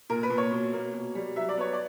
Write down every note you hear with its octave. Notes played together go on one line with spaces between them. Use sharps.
A#2 A#4
B4
A#2
C#5
B2
A#3
B2
G3
F#3 E5
D5
B3 C#5
D5